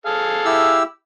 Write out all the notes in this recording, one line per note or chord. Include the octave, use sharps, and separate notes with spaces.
G#4 A4 F5
E4 G4 E6